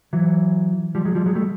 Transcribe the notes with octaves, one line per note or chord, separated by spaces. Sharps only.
E3 F#3
F3 G3
F#3 G#3
F3 G3
F#3 G#3
G3 A3